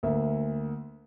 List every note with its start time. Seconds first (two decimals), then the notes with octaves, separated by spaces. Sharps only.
0.03 D2 A#3 E5